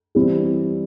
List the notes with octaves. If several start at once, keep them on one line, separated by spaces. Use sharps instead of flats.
E3 G3 C4 E4 G4